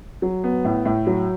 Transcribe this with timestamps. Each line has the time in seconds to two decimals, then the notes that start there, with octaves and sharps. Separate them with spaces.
0.22 F#3
0.44 B3
0.65 A2
0.85 A2
1.07 F#3